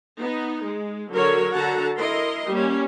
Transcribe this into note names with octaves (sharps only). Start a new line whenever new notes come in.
B3 D#4
G#3
D3 F#3 F#4 A#4 C#5
D3 F#4 A4 F#5 A5 A#5
E4 A#4 D#5 C6
G3 A#3 C#4